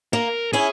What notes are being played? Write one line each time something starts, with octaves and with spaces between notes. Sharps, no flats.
A#3 A#4
C#4 E4 G#4